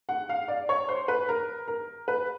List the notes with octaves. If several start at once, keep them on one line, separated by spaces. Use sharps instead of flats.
F#5
F5
D5
C#5
C5
B4
A#4
A#4
B4